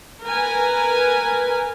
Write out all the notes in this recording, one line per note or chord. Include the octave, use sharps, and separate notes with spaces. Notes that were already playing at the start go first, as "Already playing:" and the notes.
A#4 B4 G#5